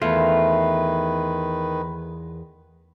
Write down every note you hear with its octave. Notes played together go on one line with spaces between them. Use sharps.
E2 D#3 A3 F4 B4